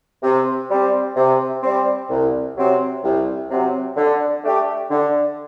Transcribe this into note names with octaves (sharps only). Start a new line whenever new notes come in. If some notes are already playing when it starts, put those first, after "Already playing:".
C3
G3 C4
C3
G3 C4
C2
C3 F#3 C4
C2
C3 F#3 C4
D3
A3 D4 G4
D3